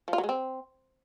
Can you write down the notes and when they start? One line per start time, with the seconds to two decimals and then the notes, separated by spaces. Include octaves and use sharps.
0.08 F3
0.13 F4
0.18 F#3
0.24 G#3
0.29 C4